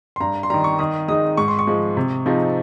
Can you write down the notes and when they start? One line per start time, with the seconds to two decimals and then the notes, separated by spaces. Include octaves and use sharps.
0.16 C6
0.20 G2 A#5
0.43 C6
0.50 D#3 G3 A#5
0.64 C#6
0.79 D#3 D#6
1.08 G#3 D#4 D#6
1.37 G#2 C#6
1.48 C6
1.59 C#6
1.67 F3 G#3
1.97 C3
2.26 F3 G#3 C4 D#4